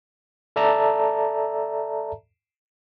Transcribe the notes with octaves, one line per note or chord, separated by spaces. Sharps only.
A4 D5 E5 A5 A#5